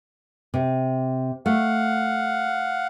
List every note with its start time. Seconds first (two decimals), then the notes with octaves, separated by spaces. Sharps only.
0.54 C3
1.46 A3 F5 F#5